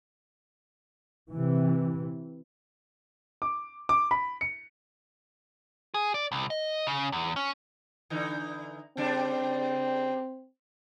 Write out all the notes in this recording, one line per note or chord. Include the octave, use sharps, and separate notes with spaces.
C3 E3
D6
D6
B5
C#7
G#4
D5
C2
D#5
C#3
E2
C#4
D3 E3 D#4
C#3 G3 C4 D4